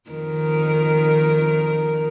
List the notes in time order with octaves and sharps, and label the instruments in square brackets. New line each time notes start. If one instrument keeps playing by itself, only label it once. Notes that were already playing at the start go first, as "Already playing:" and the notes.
[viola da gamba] F2 D#3 A#4